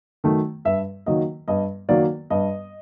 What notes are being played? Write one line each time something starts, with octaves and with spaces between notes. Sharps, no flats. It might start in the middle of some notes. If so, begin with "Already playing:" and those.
D#3 F#3 A3
G2 E5
D#3 F#3 A#3 D#5
G2 D#5
D#3 F#3 A#3 D5
G2 D#5